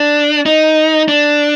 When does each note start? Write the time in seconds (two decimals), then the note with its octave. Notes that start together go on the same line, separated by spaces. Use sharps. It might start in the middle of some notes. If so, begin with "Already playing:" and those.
Already playing: D4
0.46 D#4
1.08 D4